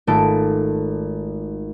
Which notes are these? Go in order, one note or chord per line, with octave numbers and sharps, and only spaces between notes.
G#1 A3 F4 A4 D7